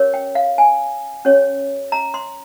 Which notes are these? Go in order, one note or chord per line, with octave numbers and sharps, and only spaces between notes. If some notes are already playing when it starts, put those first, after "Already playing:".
Already playing: C#4 G4 A#4 C#5
G5
F5
G#5
C#4 G4 C#5
A#5
C6